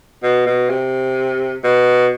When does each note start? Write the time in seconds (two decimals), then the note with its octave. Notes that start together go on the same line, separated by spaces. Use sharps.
0.23 B2
0.46 B2
0.70 C3
1.64 B2